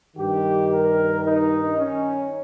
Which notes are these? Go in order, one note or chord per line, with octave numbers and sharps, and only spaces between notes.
G2 D#3 G4
A#4
D#4
C#4